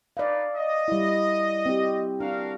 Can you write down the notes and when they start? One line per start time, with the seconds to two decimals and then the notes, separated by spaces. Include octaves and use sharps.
0.17 D#4 B4 D5 F5
0.55 D#5
0.88 G3 E4
1.66 C4 G4
2.20 D4 F#4 A#4 F5